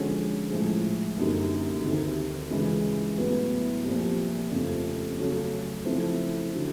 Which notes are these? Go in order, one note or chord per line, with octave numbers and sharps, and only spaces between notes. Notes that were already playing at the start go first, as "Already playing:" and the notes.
Already playing: D3 F3 G#3 C#4 F#4
A2 F3 G#3
F#2 D3 G3 A#3 D#4
D2 C3 D#3
C#2 C#3 E3 G#3 C#4
A2 F#3 B3 E4
C2 A#2 F3
F2 C#3 F3 A3
C#3 F#3 A3 C#4
C#3 F3 A3 C4 E4
D3 F#3